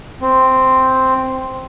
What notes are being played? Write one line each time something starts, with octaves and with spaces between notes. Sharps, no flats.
C4